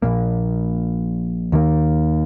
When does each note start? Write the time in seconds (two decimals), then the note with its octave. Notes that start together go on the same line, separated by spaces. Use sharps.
0.02 A#1 A#2 A#3
1.52 D#2 D#3 A#3